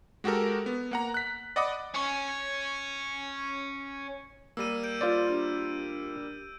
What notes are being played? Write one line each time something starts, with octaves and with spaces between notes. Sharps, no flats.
G#3 F#4 G4 A4 A#4
B3
A#3 F#5 A#5
F#6 B6
D5 D#5 F#5 B5 D6 D#6
C#4 C#5
G3 A#3 E6 D#7
G6 D7
F4 C5 D5
D4 G4